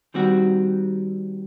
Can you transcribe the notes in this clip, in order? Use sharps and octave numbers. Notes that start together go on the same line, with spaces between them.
D#3 G3 C4 F#4